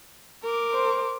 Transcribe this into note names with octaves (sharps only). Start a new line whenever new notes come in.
A#4 D6
C5